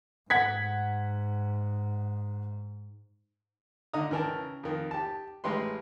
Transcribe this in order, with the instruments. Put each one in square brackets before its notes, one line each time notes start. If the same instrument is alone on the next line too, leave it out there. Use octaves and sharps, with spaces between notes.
[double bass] G#2 [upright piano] F#5 G#6 B6
[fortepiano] D3 D#4 A#5 D#6
C#3 E3 A#4 G5 A5
F2 D#3
G4 A5
A1 G#3 G4 B4 C6